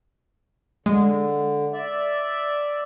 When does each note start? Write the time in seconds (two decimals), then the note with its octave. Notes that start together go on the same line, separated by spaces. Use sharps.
0.86 D3 G#3
1.73 D5 E5